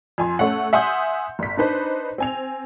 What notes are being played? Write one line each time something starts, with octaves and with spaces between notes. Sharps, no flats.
F2 G#5 C6
A3 C#4 F#5
E5 F#5 G#5 C6 D#6 G6
G1 B6
D4 D#4 B4 C5
C4 G#5 F7